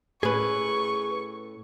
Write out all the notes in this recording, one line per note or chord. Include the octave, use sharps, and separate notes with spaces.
A2 C#4 G#4 B4 C#6